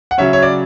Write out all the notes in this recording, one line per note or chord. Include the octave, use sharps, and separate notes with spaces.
F#5
C#3 F#3 C#4 C#5 E5
C#5
D5